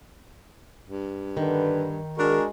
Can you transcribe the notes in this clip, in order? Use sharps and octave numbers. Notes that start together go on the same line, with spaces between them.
G2
D3 D#3 B4
G#3 D4 F#4 G#4 A#4